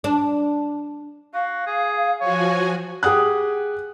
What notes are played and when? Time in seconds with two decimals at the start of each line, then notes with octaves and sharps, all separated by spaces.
0.04 D4
1.34 F#4 F5
1.67 G#4
2.21 F3 F#4 C#5 G#5
3.03 G4 G#4 F#5 D#6 F#6